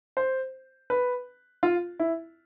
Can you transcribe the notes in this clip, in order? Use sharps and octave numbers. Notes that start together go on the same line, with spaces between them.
C5
B4
F4
E4